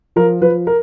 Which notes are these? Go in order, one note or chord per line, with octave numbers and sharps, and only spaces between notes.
F3 A#4
F3 B4
A#4